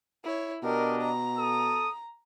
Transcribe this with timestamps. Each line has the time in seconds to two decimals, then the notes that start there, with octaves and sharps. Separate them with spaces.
0.24 E4 C#5
0.63 B2 D4 G4 A#4 D#5
1.02 A#5
1.36 A4 D#6